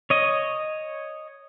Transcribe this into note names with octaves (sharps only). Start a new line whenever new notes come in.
C#5 D#5